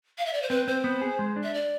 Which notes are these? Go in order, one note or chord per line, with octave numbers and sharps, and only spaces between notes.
F5
E5
D5
C5
C4 B4
C4 C5
B3
G#4
G#3
D4
E5
D5